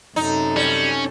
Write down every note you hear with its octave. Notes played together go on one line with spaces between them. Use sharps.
F#2 C3 D#4 A4
G3 C#4